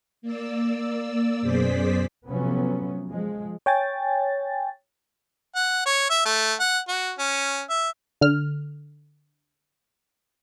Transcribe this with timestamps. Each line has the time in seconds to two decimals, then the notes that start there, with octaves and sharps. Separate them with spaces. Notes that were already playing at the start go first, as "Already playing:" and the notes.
0.22 A#3 D5 E6
1.42 F#2 B2 G#4 C5 D5 B6
2.27 C3 F3 F#3 A3 B3 C#4
3.10 F3 G#3
3.66 C#5 G5 G#5 A6
5.55 F#5
5.86 C#5
6.10 E5
6.25 A3
6.60 F#5
6.88 F#4
7.19 C#4
7.70 E5
8.21 D3 F6